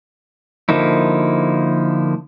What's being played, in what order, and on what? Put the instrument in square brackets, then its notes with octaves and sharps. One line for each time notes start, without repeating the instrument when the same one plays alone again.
[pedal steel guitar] D3 F3 A#3 D#4 E4